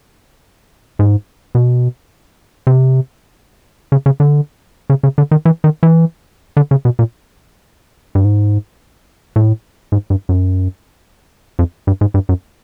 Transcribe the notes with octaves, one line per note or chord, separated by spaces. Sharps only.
G#2
B2
C3
C#3
C#3
D3
C#3
C#3
D3
D#3
E3
D#3
E3
D3
C#3
B2
A#2
G2
G#2
A2
G#2
G2
F#2
F2
G2
G#2
G2
F#2